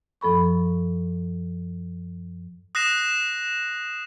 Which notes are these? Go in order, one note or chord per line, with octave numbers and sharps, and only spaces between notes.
F#2 F3 A4 B5 C#6
D#6 F#6 A#6 C7 E7